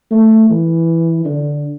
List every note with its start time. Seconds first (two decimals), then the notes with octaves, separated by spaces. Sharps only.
0.11 A3
0.50 E3
1.25 D3